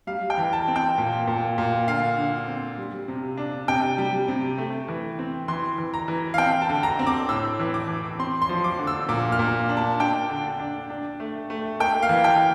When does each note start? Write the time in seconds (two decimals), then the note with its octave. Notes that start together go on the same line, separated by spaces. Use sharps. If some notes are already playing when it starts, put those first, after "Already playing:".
0.07 G3 F5
0.30 G5
0.38 E3
0.53 A5
0.68 C4
0.76 G5
0.98 A#2
1.28 A#2
1.58 A#2
1.88 D3 F5
2.18 D3
2.48 C4
2.78 G3
3.08 C3
3.37 D4
3.68 C3 G5
3.98 G3
4.28 C3
4.58 A3
4.88 E3
5.19 C4
5.48 E3 C6
5.78 E3
5.94 A#5
6.08 E3
6.34 F5
6.38 C4 G5
6.62 A5
6.69 D3
6.83 A#5
6.99 C4
7.07 D6
7.29 A2 E6
7.60 E3
7.74 D6
7.89 E3
8.19 C4 C6
8.42 C6
8.49 F3
8.64 D6
8.79 D3
8.87 E6
9.09 A#2 D6
9.32 F6
9.39 A#2
9.69 D4
9.77 A5
10.00 D4 G5
10.29 D3
10.60 D4
10.90 D4
11.20 A3
11.50 A3
11.80 A#3 G5
12.03 F5
12.09 E3
12.24 G5